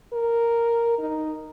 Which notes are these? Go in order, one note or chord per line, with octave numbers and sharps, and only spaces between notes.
A#4
D#4